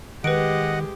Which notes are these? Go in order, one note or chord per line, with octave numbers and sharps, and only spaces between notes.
D#3 G#3 G4 B4 D#5 F#5 D7